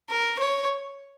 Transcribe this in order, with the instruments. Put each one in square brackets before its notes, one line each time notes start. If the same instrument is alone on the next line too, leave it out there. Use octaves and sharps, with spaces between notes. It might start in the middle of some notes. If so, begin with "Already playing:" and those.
[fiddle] A#4
C#5